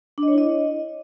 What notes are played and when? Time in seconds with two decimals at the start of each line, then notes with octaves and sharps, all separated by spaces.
0.18 D4
0.23 D#5
0.28 C#5
0.33 E4
0.38 D#5